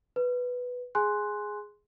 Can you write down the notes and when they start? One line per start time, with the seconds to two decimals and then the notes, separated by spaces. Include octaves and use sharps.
0.16 B4
0.95 G#4 G#5 C6 F#6